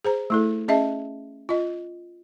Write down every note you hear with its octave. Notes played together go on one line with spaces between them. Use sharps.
G#4 C5 A#5
A3 E4 A4
C#4 G#4 D#5 E5 A5
F4 D#5